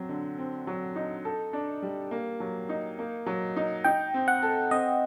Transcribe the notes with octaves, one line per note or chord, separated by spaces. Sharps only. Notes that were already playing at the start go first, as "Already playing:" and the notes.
Already playing: F#3 C4
D3
C4
F#3
D#4
A4
D4
G3
A#3
F#3
D#4
A#3
F#3
D#4
D#4 G5
C4
F#5
A4
C4 D#5